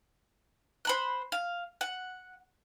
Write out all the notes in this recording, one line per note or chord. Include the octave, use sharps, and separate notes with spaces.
C5 B5 F#6
F5
F#5